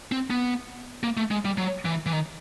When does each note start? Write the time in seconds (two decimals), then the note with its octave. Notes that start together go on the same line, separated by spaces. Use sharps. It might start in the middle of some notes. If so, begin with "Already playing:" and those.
0.12 C4
0.30 B3
1.03 A#3
1.17 A3
1.31 G#3
1.45 G3
1.58 F#3
1.85 E3
2.06 E3
2.13 D#3